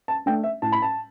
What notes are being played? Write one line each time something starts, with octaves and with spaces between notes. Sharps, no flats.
A5
A3 D4 G5
E5
A2 A5
B5
A5